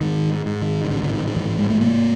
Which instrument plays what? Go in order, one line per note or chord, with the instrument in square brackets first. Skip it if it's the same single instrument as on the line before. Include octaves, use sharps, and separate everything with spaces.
[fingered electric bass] G#2 D#3
G#2
D#3
D#3
A1 D3
D3
D#3
D#3
G#2 E3
G#3
A3
C3 A#3